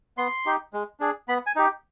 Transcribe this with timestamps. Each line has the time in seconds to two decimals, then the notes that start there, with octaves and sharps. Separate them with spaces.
0.18 B3 C6
0.46 D#4 G4
0.73 G#3
1.00 D4 G#4
1.28 B3 B5
1.47 G#5
1.56 D#4 G4